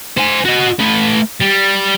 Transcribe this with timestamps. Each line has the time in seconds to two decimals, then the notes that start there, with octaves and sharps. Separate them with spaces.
0.17 C5 G#5
0.45 F#4 D#5
0.79 A3 B4
1.41 G3